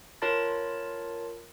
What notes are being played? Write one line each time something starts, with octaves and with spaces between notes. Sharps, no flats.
F4 A#4 C#5 A5 B5 A6